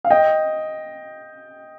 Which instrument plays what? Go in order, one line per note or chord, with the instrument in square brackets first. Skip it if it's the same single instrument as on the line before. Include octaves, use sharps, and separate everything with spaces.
[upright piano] F5
D#5 G5